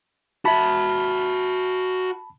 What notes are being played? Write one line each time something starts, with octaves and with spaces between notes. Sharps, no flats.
F#4 E5 A5 B5